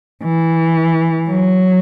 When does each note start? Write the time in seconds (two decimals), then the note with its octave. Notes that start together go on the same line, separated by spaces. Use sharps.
0.24 E3
1.29 F#3